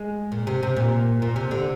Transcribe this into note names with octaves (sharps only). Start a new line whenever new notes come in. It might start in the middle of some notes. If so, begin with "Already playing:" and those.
Already playing: G#3
A#2
C3
C3
A#2
A#2
C3
D3